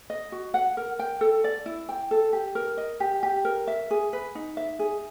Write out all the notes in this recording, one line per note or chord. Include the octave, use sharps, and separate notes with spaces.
D#5
F#4
F#5
A#4
G5
A4
D5
E4
G5
A4
G4
A#4
D#5
G4
G4
A#4
E5
G#4
B4
D#4
E5
G#4